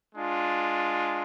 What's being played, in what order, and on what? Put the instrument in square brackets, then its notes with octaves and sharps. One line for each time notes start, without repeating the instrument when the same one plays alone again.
[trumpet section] G#3 D4 F4